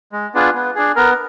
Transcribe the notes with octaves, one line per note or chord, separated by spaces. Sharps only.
G#3
B3 D4 F4 G#4
B3
D4 G#4
B3 A#4